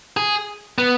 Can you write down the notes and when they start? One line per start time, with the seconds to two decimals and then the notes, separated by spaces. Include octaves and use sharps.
0.17 G#4
0.78 B3